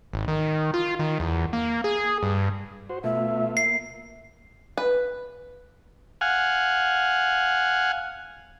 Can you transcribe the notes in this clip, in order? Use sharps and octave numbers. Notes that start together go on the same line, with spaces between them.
G#1
D#3
F4
D#3
E2
A#3
G#4
G2
F#4 C5
B2 A3 F4 E5
A#3 E5 C7
B4
F5 F#5 G#5